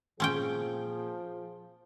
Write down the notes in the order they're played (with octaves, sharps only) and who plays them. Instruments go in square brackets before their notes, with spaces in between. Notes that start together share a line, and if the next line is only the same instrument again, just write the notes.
[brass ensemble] A#2 G#4 [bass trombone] F3 [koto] C4 C#4 G5